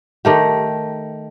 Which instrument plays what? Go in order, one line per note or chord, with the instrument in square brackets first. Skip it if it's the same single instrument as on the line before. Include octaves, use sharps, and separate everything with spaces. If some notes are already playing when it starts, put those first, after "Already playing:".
[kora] D#3 A3 G4